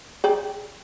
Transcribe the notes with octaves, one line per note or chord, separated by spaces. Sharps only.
G#4 D5 G5